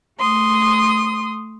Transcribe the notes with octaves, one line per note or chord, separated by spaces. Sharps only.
A3 C6 D#6